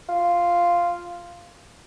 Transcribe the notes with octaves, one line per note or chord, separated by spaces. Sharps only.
F4